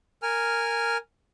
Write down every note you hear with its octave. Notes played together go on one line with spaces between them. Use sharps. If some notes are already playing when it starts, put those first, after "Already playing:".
A#4 G#5 F6